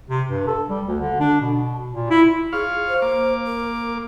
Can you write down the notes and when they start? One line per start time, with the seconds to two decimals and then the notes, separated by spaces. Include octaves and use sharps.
0.09 C3
0.30 G2
0.47 A4
0.69 G3
0.88 D2
1.00 D3
1.20 D4
1.41 B2
1.92 A#2
2.10 E4
2.53 F4 G#4 C#5 F5
2.88 C5
3.02 A#3 D6
3.46 A#4